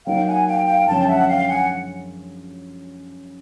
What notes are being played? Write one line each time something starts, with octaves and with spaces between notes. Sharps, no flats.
F#3 A#3 D#4 F5 G5
F#5 G#5
F5 G5
F5 G5
F#2 D3 F3 G#3 C#4 G5 A5
E5 F#5
F5 G5
F#5 G#5